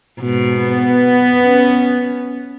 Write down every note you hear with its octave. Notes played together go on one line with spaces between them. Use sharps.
G#2 B2
B3
C#4